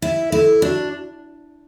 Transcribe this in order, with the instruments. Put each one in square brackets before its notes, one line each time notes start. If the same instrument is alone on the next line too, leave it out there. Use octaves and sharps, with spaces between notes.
[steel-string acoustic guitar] E4 [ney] E5
[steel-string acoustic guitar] E4 [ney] A4
[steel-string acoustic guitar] D4 [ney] F#4